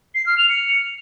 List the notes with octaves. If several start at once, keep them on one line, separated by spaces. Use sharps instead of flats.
C7
F6
F7
C#7